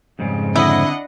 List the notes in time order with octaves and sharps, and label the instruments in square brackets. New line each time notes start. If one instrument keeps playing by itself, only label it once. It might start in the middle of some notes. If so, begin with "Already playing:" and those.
[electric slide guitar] F2 G#2 C#3 [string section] G3
[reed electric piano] D3 C4 [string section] D4 D#5 F#5 [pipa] E4